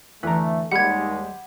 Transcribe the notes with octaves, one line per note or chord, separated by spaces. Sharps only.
E2 D3 A3 B4 A#5
D#2 G3 G#3 G4 F#5 B5 G#6